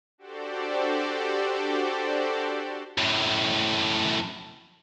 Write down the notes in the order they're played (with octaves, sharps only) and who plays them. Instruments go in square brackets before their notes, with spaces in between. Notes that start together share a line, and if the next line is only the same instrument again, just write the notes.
[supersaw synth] D4 F#4 G4 A4 C5 D5
[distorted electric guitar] F#2 A2